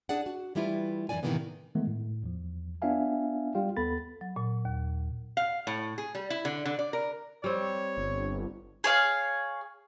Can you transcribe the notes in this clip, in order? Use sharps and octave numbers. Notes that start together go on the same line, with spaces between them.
D4 G#4 D5 F#5
F#4
E3 G3 A3 E4 F4 B4
F#2 E3 F#3 D4 D5 G#5
A2 C3 D#3 E3 A#3 B3
D#3 E3 G#3 A3 B3
A2
E2 F3
B3 D4 F4 E5 F5 G#5
G3 F4 G4 F5 G5
D#2 B3 A4 B5 A6
F#3
A#2
D#2
F5
A2
G#4
G3
E4
D3
D3
D5
A#4
G3 C4 C#5
G1
G#4 C#5 F5